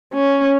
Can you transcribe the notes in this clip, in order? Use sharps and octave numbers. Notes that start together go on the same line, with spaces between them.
C#4